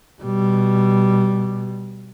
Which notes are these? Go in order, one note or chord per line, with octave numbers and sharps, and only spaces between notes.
B2 G3